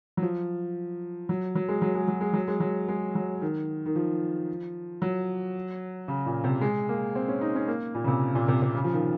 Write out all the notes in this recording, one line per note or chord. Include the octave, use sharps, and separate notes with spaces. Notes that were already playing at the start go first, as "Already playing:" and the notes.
F#3
F3
F#3
F#3
G#3
F#3
G#3
F#3
G#3
F#3
G#3
F#3
G#3
F#3
D#3
D#3
F3
F#3
C#3
A#2
C3
G#3
A#3
C4
C#4
D#4
C#4
A#3
A#2
C#3
C3
A#2
C3
C3
C#3
F3
D#3